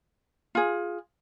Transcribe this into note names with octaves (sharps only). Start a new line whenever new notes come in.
F4 G#4